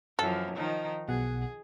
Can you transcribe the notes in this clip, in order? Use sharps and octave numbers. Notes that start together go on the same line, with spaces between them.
F#2 E3 F3 A4 F6
D#3 F3 D#4
B1 B2 G#4 F#5